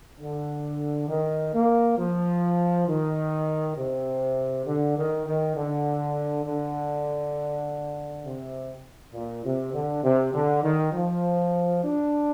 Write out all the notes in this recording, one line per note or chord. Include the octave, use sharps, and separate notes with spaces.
D3
D#3
A#3
F3
D#3
C3
D3
D#3
D#3
D3
D3
C3
A#2
C3
D3
C3
D3
D#3
F3
D4